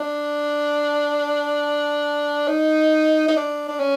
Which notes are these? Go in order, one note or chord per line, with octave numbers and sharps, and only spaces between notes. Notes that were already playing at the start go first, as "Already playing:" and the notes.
Already playing: D4
D#4
D#4
D4
D4
C#4